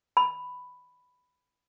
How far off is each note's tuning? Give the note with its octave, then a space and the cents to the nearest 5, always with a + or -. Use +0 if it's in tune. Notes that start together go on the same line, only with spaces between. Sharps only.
B5 +5